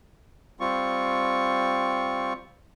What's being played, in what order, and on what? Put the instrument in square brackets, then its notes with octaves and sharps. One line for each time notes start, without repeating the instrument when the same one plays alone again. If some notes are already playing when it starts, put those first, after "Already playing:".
[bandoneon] G3 C4 F4 C#6